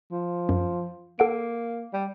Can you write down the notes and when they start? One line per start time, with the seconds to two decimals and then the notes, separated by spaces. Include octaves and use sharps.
0.12 F3
0.49 F#2
1.19 A#3 A4 F#5 D7
1.93 G3